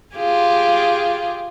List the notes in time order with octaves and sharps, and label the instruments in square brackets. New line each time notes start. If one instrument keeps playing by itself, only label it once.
[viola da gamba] F4 G4 G#4